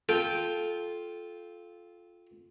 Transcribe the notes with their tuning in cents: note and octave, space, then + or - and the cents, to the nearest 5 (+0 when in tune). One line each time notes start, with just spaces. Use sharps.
F4 +0 A4 -20 G5 +0